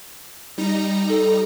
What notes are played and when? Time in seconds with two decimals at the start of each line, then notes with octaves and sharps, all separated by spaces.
0.58 G3 D#4 A#5
1.09 A4